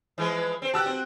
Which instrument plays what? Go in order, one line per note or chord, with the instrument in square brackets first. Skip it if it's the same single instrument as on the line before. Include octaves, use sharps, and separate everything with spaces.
[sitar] E3 F3 G#3
C4 C5
[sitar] F#4 G4 [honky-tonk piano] A5 E6 F#6
[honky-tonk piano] C4